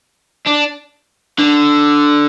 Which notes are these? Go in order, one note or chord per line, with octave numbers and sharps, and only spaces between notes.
D4
D3